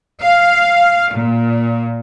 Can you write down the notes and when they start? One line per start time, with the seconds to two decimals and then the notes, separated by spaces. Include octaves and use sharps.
0.23 F5
1.14 A#2